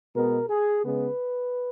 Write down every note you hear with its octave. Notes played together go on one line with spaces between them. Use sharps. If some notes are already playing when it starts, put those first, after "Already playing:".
B2 G#3 B3 A#4
G#4
C#3 G#3 B3 B4